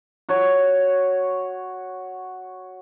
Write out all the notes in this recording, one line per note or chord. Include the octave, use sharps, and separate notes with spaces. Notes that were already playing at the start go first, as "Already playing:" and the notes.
F#4 C#5